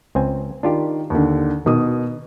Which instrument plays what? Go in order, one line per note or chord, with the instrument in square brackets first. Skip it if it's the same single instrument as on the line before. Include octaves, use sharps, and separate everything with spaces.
[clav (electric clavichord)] C#2 C4 G#5
[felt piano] D#3 [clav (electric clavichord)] D4 F4 G4
[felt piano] D#2 D3
[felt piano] B2 D#6 [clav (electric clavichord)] D#3